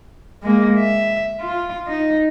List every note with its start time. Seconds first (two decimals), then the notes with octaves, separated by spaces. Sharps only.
0.43 G#3 A#3
0.80 E5
1.40 F4
1.88 D#4